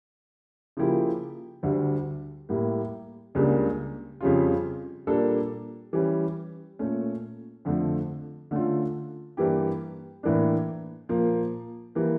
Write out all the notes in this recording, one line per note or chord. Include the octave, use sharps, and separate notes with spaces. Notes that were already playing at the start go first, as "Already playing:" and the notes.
C#3 F3 A#3 E4 G4
D2 D3 G3
A2 G3 A#3
C#2 C#3 G3 A#3 D4
F2 C#3 G3 C#4 F4
A#2 G3 A#3 D4 A4
E3 G3 C#4
A#2 A3 C#4
F2 D3 F3 A3
D3 A3 C#4 F4
G2 E3 A#3 E4 G4
A2 E3 A#3 D4
A#2 F3 A#3
E3 G3 A#3